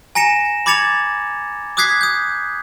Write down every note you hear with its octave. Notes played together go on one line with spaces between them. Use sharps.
G#5 A#5 A#6 C#7 E7
B5 D6 G#6 A6 C#7 F7
D6 D#6 F#6 G#6 B6 C7
D#6 G6